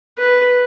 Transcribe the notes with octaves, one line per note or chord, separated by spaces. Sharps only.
B4